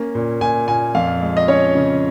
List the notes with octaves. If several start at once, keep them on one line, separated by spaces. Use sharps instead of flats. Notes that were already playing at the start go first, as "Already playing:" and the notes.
Already playing: A#3 C#4
A#2
A#2 G#5
A#2 G#5
F2 F5
G#3
D#5
C#4 C#5
C#3